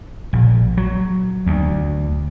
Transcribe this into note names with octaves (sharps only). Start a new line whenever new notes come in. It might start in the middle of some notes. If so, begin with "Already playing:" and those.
A#1
F#3
D2